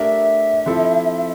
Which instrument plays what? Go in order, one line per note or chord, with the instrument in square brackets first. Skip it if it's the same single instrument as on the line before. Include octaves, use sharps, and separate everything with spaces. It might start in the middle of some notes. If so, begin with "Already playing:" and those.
Already playing: [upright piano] A3 D4 G4 A#4 [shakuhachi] E5
[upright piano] F3 C4 E4 A4